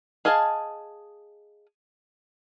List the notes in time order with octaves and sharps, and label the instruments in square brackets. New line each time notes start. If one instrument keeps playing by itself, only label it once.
[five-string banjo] G#4 D#5 F5 G#5 A5